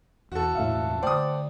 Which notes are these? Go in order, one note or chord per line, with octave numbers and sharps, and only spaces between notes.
E1 E2 F#4 A4
E1 C#2 A2 C#4 E5 F5
D3 A3 C5 D5 G5 D#6